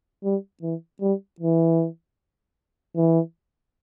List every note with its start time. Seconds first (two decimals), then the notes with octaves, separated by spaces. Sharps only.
0.24 G3
0.62 E3
1.01 G3
1.40 E3
2.96 E3